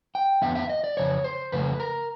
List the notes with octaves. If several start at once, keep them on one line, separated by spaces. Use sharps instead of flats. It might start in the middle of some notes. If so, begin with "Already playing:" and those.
G5
F2 D3 F3 B3 E5
E5
D#5
D5
F2 C#3 C#5
C5
F2 C#3 A3 B4
A#4